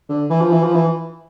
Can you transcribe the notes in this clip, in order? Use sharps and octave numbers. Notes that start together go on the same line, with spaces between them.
D3
E3
F3
E3
F3
E3